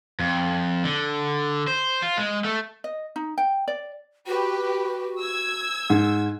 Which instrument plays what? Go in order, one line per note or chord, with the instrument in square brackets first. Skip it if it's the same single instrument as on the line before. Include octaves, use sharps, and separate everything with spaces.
[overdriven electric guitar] F2
D3
C5
F4
G#3
A3
[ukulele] D#5
D#4
G5
D5
[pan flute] F#4 [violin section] G4 B4
[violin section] E6 G#6
[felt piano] G#2